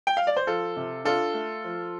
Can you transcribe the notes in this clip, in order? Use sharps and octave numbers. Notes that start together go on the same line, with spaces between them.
G5
F5
D5
C5
F3 F4 A4
C3
D4 F4 A4
A3
F3